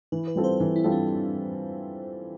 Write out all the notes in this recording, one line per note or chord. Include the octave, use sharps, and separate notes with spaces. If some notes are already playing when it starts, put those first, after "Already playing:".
E3 B4
B4
G3 C4 F4 A4
C5
E3
E4
G3 C4 F4 A4
D4